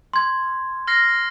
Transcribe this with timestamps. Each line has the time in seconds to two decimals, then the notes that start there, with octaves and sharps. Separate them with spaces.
0.14 C6 G#6
0.87 F6 A#6 C7